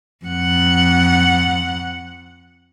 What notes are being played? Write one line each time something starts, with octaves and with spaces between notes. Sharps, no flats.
F2 F#5